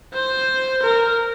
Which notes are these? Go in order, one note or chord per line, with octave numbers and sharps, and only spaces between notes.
C5
A#4